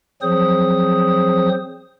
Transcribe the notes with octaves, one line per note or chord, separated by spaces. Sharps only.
F3 F#3 C4 G#4 C5 D#6